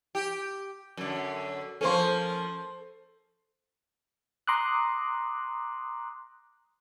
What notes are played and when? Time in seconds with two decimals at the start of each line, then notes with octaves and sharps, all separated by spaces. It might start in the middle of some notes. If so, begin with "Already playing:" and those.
0.15 G4
0.97 F#2 D3
1.81 F3 A#3 C#4 A4 C5 C6
4.47 A#5 C6 D6 D#6 F#6